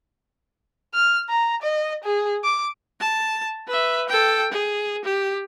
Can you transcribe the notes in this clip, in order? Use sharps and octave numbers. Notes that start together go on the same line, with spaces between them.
F6
A#5
D#5
G#4
D6
A5
B4 E5
A4 G5
G#4
G4